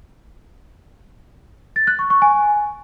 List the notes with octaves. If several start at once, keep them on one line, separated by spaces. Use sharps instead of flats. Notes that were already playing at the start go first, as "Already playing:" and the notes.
A6
F#6
C#6
C#6
G#5